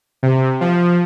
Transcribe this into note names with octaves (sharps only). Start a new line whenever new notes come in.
C3
F3